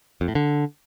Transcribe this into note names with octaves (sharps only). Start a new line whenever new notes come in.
F2
A2
D3